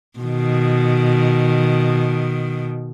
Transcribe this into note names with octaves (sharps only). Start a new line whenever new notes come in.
B2 D#3